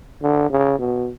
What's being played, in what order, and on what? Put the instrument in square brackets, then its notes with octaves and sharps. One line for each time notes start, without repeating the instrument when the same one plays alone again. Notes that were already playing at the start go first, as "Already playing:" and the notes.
[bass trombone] D3
C#3
B2